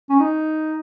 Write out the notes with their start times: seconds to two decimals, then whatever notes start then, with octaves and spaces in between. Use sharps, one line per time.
0.10 C#4
0.20 D#4